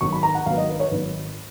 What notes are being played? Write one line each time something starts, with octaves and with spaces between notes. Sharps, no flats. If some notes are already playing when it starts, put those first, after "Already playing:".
G#1 G#2 F#3 B3 C#6
B5
A#5
F#5
G#1 G#2 F#3 B3 F5
D#5
B4
C#5
G#1 G#2 F#3 B3 B4